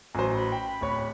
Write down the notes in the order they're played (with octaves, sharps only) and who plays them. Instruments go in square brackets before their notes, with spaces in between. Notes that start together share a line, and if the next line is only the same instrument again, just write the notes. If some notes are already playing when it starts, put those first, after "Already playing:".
[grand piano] A1 F#3 C5 [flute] G#5
[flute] B5
[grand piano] G5
D1 C#5